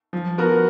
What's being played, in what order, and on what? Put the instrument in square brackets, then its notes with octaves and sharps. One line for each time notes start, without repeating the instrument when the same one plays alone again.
[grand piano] F3
B3 F#4 A#4